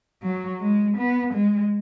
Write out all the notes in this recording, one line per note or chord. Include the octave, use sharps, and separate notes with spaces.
F#3
G#3
B3
G#3